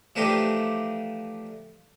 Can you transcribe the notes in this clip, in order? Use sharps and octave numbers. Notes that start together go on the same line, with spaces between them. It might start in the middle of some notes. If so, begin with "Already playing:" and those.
E3 F3 A3 D4 D#4 G4